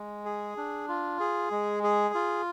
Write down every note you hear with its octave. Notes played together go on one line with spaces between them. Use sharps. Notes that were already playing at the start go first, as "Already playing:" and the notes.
Already playing: G#3
G#4
D4
F4
G#4
G#3
G#4
F4